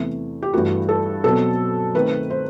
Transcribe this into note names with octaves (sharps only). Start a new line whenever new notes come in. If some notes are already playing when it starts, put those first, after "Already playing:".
Already playing: E2 C3 E3 A3
G4
G2 E3 A3 F#4
A4
B2 F#3 C4 A4
D#3 A3 C4 B4
C5